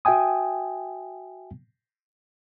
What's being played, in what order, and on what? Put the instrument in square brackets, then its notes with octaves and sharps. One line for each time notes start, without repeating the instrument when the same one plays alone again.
[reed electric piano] F#4 E5 G5 G#5 D#6